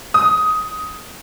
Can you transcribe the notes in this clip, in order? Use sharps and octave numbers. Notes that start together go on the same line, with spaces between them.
D#6